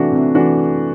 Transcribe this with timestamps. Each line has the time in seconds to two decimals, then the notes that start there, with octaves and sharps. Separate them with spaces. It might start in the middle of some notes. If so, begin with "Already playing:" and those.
Already playing: C3 E3 A3 D4 F#4
0.12 C3
0.35 E3 A3 D4 F#4